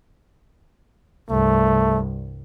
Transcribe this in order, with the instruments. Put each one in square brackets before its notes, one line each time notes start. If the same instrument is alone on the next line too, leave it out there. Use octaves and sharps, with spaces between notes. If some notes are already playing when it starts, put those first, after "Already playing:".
[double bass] C2 G2 [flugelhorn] A3